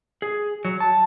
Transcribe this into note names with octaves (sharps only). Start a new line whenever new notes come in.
G#4
F#3
A5